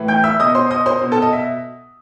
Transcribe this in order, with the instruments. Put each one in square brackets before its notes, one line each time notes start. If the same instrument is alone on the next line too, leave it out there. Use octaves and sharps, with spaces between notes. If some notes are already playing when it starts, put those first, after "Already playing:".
Already playing: [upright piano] A2 E3
G5 G6
E5 E6
B2 D#5 D#6
C5 C6
D#5 D#6
C5 C6
B2
A4 A5
D#5
E5